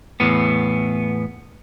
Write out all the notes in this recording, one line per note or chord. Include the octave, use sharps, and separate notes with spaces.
E2 A2 B3